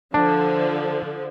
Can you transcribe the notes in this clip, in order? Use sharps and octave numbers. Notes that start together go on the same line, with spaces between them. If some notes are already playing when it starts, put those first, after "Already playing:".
D3 F3 D4